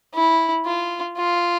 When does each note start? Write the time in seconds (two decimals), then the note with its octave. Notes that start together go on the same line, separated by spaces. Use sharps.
0.15 E4
0.65 F4
1.18 F4